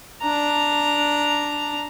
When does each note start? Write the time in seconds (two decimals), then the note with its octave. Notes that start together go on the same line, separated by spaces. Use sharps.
0.22 D4 A#5